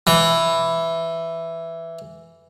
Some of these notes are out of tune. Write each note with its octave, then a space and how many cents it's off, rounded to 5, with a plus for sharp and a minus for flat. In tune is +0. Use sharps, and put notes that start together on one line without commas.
E3 +5